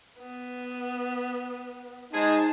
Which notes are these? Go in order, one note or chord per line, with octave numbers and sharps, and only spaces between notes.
B3
G#3 D#4 G#4 C5 A5